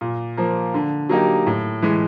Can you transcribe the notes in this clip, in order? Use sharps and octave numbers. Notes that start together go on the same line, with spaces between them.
A#2
F3 A#3
D3
F#3 A#3 D#4 G4
A2
E3 G#3